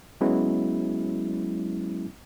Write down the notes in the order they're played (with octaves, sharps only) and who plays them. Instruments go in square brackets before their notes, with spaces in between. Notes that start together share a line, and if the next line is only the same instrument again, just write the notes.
[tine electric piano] F#3 G#3 B3 C#4 E4